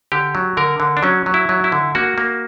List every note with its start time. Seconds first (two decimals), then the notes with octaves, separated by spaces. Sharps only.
0.12 D3 G4
0.35 F#3
0.57 D3 A#4
0.80 D3
0.97 D4
1.03 F#3 C#4
1.26 F#3
1.34 E4
1.49 F#3
1.64 E4
1.72 D3
1.95 A#3 F#4
2.18 A#3